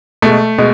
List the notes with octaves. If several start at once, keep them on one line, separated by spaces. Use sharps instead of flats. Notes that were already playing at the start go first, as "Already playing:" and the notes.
B2 G#3 A3
B2 G#3